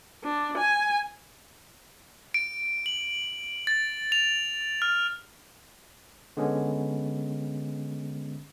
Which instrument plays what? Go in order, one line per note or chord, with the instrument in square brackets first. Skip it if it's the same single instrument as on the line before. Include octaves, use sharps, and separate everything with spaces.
[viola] D4
G#5
[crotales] D7
F#7
A6
F7
F6
[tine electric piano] D3 G#3 B3 C#4